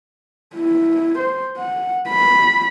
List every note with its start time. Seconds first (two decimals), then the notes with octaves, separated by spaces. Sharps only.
0.55 E4
1.19 C5
1.57 F#5
2.09 B5